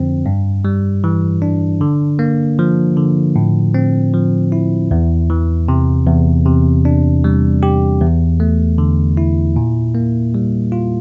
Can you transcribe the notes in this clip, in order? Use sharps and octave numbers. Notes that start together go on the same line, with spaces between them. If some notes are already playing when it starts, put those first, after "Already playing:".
Already playing: F2 D3 F3 C4
G2
G3
E3
D4
D3
A#3
F3
D3
A2
C4
F3
E4
E2
E3
C3
E2
C3
D4
G3
G4
E2
A3
D3
E4
A#2
A#3
G3
F4